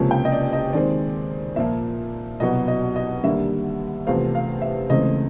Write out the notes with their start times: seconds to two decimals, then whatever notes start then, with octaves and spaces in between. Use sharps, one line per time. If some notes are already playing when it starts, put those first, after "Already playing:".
Already playing: C#2 C3 F3 A#3 C#4
0.11 G5
0.25 D#5
0.32 D5
0.53 D#5
0.73 D#2 D#3 G#3 C4 D5
1.56 A#2 F3 A#3 E5
2.40 C2 B2 F#3 B3 D#5
2.68 D#5
2.96 D#5
3.23 D#2 D3 G3 A#3 E5
4.07 E2 C3 F3 A3 C4 F5
4.35 F5
4.62 E5
4.90 C#2 C#3 E3 A3 C4 D#5